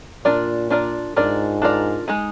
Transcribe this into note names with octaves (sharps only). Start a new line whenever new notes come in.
A#2 D4 F4 A#4 D5
D4 F4 A#4 D5
G#2 D4 F4 A#4 D5
D4 F4 A#4 D5
G#3 D#4 G#4